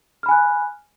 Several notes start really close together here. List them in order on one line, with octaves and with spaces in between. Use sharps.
F6 B5 G#5 F#6